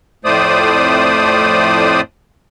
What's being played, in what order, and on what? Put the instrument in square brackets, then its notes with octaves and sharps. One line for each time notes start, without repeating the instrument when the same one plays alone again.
[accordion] F2 A2 A3 C5 D5 D#6